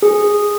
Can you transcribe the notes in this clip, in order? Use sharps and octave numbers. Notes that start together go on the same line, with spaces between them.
G#4